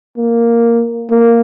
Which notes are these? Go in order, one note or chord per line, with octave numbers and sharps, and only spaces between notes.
A#3
A#3